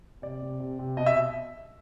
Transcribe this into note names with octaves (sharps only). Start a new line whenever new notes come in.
C3 D5
C3
C3
C3
B2 D#5
E5